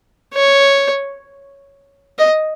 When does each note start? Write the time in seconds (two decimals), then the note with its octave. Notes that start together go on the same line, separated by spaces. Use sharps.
0.34 C#5
2.19 D#5